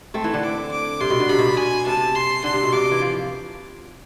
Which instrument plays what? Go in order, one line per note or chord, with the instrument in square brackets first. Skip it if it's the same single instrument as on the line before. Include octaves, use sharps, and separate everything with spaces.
[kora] A3 C4 [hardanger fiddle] A5
[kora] E3
D3
[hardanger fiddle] D6
D6
[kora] C3 [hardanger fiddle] C6
[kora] B2
D3
[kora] C3 [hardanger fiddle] B5
[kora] B2
B2
[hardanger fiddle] G#5
[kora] C3 [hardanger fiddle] A5
[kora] C3
[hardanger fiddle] C6
[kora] D3 [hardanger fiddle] C6
[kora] C3
B2
[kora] C3 [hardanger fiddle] D6
[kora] E3
F3